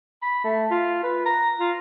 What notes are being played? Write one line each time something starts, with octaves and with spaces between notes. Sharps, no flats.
B5
A3
F4
B4
A#5
F4